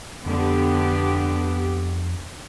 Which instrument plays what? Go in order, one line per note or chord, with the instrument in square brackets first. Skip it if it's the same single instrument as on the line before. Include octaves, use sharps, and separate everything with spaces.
[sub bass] F2 [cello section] D3 B3 G4